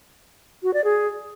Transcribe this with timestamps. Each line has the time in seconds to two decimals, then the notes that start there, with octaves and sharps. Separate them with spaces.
0.63 F#4
0.74 D5
0.84 G#4